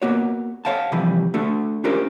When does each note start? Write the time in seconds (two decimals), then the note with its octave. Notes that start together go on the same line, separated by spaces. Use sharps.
0.02 A#3 B3 F#4 C#5
0.65 A4 C5 C#5 F5 F#5 A5
0.92 C3 E3 F3 G3 B5
1.34 A3 D4 F#4 A4
1.84 C#4 D4 F4 G4 A#4 C5